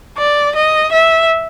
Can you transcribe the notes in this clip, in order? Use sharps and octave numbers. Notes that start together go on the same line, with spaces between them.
D5
D#5
E5